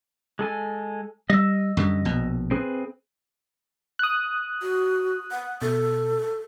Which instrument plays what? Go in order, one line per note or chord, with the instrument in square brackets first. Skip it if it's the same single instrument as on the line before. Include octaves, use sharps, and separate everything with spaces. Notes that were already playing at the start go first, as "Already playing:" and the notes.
[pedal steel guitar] G#3 A4 G#5
[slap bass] G3 [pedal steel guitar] D#5 E6
[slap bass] F#2 D3 G3
A#1 B2
[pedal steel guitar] C4 G#4 B4
[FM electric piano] D#6 F#6
[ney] F#4
F#5
[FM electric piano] B2 [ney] A4